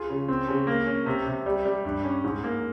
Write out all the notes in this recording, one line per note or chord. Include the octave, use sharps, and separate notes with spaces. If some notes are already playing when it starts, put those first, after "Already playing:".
Already playing: F4 G#4
C#3
C4
C#3
A#3
C#4
C3
C3
G3
G3
G2
C#4
G#2
A#3